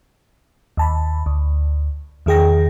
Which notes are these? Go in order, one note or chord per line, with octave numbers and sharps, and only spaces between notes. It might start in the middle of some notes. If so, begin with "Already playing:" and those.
D#2 A5 B5
D2
E2 D#3 G#4 G5 A#6